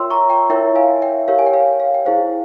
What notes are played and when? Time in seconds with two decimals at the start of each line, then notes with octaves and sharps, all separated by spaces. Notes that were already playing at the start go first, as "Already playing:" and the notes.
Already playing: F4 A#4 C#5 E5 G5 C6 E6
0.10 A#5 C#6
0.30 G5 A#5
0.50 E4 A#4 C#5 E5 G5
0.76 F5 G#5
1.02 E5 G5
1.28 G4 A#4 C#5 F5
1.39 G#5
1.47 G5
1.54 F5
1.80 F5
1.94 G5
2.06 E4 G#4 C5 F5